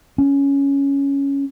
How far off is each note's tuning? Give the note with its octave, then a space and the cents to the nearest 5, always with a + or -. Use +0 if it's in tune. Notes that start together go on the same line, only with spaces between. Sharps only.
C#4 +5